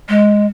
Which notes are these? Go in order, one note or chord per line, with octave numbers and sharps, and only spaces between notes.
G#3